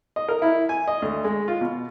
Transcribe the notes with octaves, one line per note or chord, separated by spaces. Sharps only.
D#5
A#4
E4
G#5
D#5
D2
G#3
F4
B2